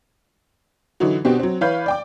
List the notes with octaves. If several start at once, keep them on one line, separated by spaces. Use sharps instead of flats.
D3 E3 F#3 D#4 F#4
B2 C4 D4 F#4 G4
F#3 C4
E3 B4 C#5 F5 B5 G6
D5 G5 D6